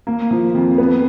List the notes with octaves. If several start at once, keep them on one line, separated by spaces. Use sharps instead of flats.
A#3
F3
F2
B3